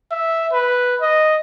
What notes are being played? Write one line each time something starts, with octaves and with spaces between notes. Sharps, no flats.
E5
B4
D#5